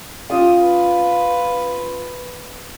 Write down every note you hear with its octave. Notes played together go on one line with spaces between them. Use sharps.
C#4 F4 G4 D#6
B4